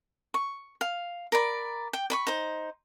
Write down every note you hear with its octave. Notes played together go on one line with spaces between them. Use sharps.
C#6
F5
A#4 D5 B5
G5
D5 B5 C#6
D#4 C5